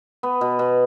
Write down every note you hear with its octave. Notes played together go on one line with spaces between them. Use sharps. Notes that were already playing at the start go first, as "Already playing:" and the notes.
B3
B2
B2